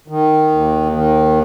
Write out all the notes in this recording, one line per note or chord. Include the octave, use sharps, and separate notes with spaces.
D#3
D#2
D#3